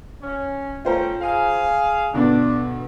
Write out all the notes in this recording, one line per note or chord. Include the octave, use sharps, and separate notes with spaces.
C#4
A3 C#4 F4 C5 G5 A#5
G#4 F5
G2 B2 D3 D4